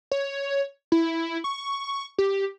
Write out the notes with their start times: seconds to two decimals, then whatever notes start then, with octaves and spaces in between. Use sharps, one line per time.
0.11 C#5
0.92 E4
1.44 C#6
2.18 G4